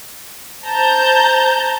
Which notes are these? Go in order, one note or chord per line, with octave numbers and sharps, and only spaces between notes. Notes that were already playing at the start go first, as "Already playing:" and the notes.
C5 A5 A#5 G6